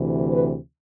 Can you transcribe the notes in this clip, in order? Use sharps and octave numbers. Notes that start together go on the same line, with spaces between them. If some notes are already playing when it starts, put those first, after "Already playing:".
Already playing: D2 C3 E3
B4